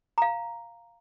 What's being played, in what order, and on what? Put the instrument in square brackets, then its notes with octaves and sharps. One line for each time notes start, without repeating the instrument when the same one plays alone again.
[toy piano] F5 A#5